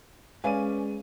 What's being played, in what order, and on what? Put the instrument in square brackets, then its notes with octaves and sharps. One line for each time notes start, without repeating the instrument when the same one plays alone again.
[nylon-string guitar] G#3 [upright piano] C#4 D5 D#7 [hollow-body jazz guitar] B4 F5 G#5